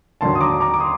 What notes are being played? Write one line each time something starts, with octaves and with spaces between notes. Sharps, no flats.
D#2 D3 F#3 A5 C6
D#6
A#5 D6
A#5 D6
D6
C6 D#6